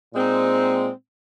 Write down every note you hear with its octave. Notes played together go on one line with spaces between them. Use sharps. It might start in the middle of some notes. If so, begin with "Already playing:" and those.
A#2 G#3 C4 D#4